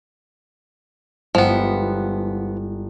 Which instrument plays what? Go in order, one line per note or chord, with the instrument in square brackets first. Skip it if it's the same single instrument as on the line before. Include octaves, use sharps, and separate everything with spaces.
[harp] G1 G#3 E4 [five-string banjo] F3 B3